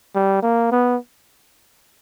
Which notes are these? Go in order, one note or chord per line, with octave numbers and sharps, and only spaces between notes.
G3
A#3
B3